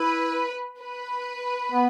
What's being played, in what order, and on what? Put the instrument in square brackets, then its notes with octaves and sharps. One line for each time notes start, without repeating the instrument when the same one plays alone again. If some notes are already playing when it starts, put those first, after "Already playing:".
Already playing: [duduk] E4 [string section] B4
[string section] B4
[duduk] B3